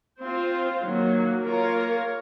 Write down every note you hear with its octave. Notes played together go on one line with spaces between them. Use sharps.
C4 F4 C5
D#3 F#3 A#3
A#3 F4 A#4 C#5